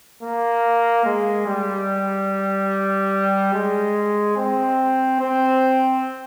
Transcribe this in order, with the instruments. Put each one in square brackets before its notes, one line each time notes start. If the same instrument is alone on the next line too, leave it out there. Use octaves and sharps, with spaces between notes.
[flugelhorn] A#3
G#3
G3
G#3
C4
C4